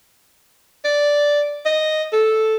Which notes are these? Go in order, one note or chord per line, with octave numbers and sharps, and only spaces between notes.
D5
D#5
A4